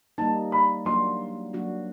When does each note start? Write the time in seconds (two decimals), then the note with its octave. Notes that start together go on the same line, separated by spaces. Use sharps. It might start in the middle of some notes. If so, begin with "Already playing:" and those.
0.18 G3 A#3 D#4 A5
0.52 B5
0.85 F#3 A#3 D4 F#4 C6
1.53 F#3 A#3 D4 F#4